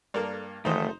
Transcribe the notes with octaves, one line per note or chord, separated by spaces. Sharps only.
G2 A#3 A4 A#4 D5
F#1 D#3 E3 A3 D#4 C5 D#5